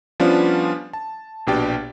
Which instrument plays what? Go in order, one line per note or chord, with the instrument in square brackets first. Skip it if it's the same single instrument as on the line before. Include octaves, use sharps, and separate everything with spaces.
[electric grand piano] F3 G3 B3 C#4 D4 F4
A5
A#1 B2 D4 G4 G5 A6